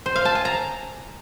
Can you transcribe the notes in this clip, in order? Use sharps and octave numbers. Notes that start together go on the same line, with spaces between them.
C5
F5
A5
G#5
A#5